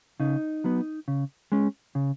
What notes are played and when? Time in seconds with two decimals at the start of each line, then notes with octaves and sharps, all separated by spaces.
0.20 C#3 D#4
0.64 F#3 B3
1.08 C#3
1.52 G#3 C#4
1.95 C#3